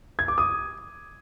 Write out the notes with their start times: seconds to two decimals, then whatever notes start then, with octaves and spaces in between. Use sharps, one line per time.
0.19 G#6
0.28 D6
0.38 D#6